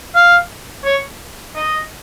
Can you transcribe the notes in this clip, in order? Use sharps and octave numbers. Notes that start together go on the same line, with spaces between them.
F5
C#5
D#5